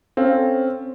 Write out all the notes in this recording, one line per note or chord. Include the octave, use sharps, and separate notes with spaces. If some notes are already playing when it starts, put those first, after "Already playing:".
C4 C#4 A4 F5